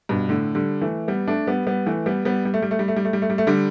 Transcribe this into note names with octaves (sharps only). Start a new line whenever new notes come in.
G2 B2
A2 D3
D3 G3
E3 A3
G3 B3
A3 D4
G3 B3
G3 B3
E3 A3
G3 B3
G3 B3
G3
A3
G3
A3
G3
A3
G3
A3
G3
A3
G3
A3
D3 G3